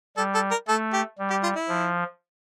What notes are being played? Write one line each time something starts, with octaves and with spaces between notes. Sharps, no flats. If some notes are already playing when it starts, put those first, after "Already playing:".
G3 A4
A4
A#4
A3 A4
G4
G3
G4
F4
E4
F3